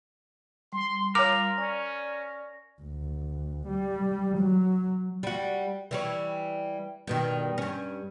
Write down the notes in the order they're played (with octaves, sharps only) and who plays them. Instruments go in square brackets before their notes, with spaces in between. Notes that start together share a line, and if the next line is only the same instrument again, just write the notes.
[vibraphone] G3 [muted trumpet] C6
[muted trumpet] F4 [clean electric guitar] A#4 [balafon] C#5 D6
[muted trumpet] C#4 [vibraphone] D5
[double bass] D2
G3
F#3
[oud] G3 F#4
E3 G3 C#5
G2 B2 D#3
G2 C#4